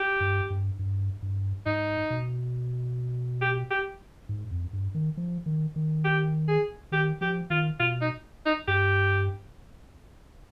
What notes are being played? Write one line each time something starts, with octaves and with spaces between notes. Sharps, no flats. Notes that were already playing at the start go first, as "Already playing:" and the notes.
Already playing: G4
G2
G2
G2
G2
G#2 D#4
B2
G4
G4
G#2
F2
G2
D#3
F3
D#3
D#3
G4
G#4
D#3 G4
F3 G4
D#3 F4
B2 F4
D#4
D#4
G2 G4